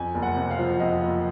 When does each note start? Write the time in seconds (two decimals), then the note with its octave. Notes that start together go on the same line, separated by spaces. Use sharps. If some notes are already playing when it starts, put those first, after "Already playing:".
Already playing: F2 G#5
0.15 F#1
0.23 F#5
0.36 C3
0.51 F5
0.59 F3
0.80 F2 D#5
1.01 F#1